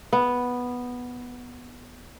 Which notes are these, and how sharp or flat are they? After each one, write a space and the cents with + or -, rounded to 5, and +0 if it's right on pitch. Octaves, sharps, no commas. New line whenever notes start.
B3 -5